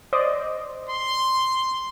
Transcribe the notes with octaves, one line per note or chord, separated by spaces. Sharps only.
C5 D5 D#5
C6